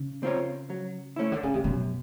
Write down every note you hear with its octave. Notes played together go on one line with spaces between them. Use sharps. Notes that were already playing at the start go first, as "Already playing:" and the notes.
Already playing: C#3
C4 F4 A#4 C#5
F#3
A3 C#4 E4
D3
C#3
C3
F#2 B2